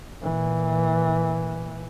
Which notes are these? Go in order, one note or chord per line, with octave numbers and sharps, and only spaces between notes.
A#2 E3